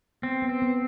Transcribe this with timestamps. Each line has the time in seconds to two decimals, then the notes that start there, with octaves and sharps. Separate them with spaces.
0.22 B3 C4
0.42 B3
0.49 C4
0.62 B3